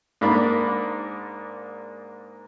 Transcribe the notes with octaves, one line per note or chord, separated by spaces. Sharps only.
G#2 A#3 D4 D5 B5